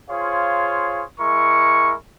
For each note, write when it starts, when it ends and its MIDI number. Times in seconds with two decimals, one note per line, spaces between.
0.10 1.03 65
0.10 1.03 68
0.10 1.03 72
0.10 1.03 73
0.10 1.03 77
1.20 1.94 56
1.20 1.94 64
1.20 1.94 70
1.20 1.94 85